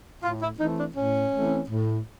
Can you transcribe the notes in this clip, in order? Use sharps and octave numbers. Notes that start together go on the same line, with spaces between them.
A2 F4
E4
E3 A3 C4 D#4
D4
A2 C#4
E3 A3 C4
A2